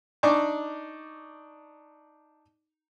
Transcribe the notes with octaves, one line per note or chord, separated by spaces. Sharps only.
D4 D#4 D5 C#6 D6